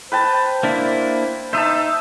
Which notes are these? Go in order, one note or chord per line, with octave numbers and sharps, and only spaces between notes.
B4 C5 G5 A5
A#3 D4 E4
D#4 C5 E5 A5